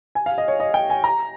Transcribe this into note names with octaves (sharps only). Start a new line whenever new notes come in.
G#5
F5
D#5
C#5
D#5
G5
G#5
A#5